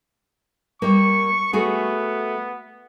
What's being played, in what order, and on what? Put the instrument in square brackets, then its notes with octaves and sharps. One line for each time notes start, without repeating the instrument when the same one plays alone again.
[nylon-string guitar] G3 A#3 [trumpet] C#6
[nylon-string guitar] A3 F#4 G#4 [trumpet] B3